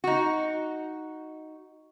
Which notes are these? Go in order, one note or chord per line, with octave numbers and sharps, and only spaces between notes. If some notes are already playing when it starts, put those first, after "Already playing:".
D#4 F#4